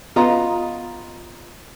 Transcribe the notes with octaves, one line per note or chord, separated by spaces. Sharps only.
B3 F4 D#5 A#5